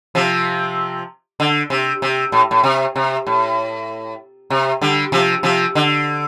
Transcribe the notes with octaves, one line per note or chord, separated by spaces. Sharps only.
C3 F3
D3
C3
C3
A2
A2
C3
C3
A2
C3
D3 G3
C3 F3
C3 F3
D3